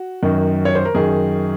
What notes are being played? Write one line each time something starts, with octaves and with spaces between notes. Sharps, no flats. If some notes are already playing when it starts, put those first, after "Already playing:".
Already playing: F#4
F#2 D#3
C#5
C5
A#4
F#2 D#3 G#4